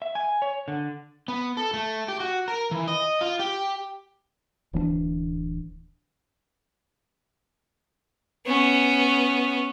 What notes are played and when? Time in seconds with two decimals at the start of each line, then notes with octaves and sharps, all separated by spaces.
0.02 E5
0.15 G#5
0.42 C#5
0.68 D3
1.28 B3
1.57 A4
1.74 A3
2.08 G4
2.20 F#4
2.48 A#4
2.71 E3
2.88 D#5
3.21 F4
3.39 G4
4.73 D1 E3 C4 D4
8.46 B3 C#4